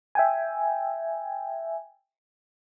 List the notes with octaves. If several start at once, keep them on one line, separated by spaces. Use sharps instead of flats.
E5 G5 G#5